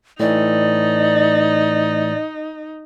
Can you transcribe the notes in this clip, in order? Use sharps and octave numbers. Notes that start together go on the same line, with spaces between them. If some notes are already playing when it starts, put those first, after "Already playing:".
A2 E3 D#4 D5